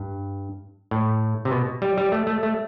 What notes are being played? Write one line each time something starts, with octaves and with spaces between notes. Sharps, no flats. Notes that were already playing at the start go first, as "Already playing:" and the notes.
Already playing: G2
A2
C3
B2
G3
G3
A3
A3
A3